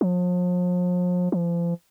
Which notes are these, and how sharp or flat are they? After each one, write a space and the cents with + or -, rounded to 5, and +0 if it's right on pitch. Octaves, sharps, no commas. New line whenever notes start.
F3 +40
F3 -35